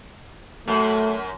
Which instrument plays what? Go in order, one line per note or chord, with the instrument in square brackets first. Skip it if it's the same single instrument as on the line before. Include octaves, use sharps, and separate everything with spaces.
[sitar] F#2 [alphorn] A3